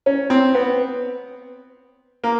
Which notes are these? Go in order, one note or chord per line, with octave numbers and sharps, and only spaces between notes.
C#4
C4
B3
A#3